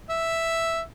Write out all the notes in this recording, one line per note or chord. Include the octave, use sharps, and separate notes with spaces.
E5